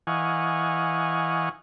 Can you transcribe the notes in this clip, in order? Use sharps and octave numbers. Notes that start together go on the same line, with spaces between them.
E3 D#5 F5 F#5 G#5 C#6